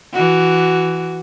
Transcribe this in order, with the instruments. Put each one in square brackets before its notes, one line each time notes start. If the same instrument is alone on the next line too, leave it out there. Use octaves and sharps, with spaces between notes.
[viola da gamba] E3 F#4